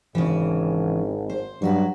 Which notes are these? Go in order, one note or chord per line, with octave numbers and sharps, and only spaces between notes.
G#1 C#3 E3
C5
G2 F#3 F#4 B4